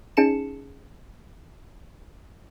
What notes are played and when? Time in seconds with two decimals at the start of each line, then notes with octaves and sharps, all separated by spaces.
0.17 C#4 D#4 G#4 A5 C#7 E7